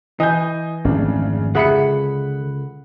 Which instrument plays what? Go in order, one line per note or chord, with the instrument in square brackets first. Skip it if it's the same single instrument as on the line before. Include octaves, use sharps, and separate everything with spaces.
[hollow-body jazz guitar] E3 [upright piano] D#5 G#5 G6
[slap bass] G#1 F2 A3 [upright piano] C#3 D4
[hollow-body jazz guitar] C#2 G#4 E5 [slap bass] D3 [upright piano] F#5 B5 C#7